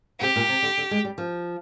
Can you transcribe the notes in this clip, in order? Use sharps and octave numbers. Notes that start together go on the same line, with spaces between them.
C3 G4
A#2
C3
D3
D3
G#3
G3
F3